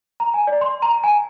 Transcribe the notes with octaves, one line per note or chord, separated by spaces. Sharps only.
A#5
G#5
D5
C6
A#5
G#5